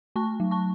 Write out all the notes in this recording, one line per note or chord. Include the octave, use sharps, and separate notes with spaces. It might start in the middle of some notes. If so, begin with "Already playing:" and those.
A3 A5 C#6
F#3
A5 C#6